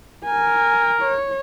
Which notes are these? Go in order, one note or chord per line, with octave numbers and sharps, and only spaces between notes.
A#4 G#5
C#5